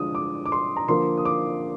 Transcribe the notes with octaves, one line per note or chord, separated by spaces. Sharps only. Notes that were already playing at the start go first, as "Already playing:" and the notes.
Already playing: D3 F3 G#3 D#6
D6
D6
C6
A#5
D3 F3 A#3 C6
D#6
D6